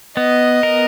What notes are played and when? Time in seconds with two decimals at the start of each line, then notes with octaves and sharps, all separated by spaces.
0.17 B3 D#5
0.63 A#4